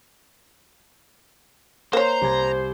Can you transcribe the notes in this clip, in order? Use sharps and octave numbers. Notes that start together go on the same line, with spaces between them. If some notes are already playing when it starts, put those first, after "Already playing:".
A#3 C5 C#5 A#5
C2 G#6